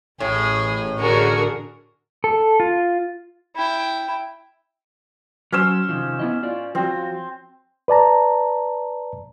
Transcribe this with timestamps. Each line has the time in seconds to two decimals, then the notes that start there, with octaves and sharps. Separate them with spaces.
0.20 A1 A2 G#4
0.99 D3 F#4 G#4 A#4 C#6
2.24 A4
2.60 F4
3.56 E4 G5
5.52 F#3 C#4 C5 E6
5.89 C3 D#3 F3
6.19 B3 E4 D#5
6.43 F4 D5
6.75 F3 C4 F4 F#4
7.88 B4 D5 A5 A#5